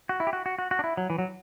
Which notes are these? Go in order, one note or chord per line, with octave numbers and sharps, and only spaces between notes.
F#4
E4
G4
F#4
F#4
F#4
F#4
D4
E4
F#3
E3
F#3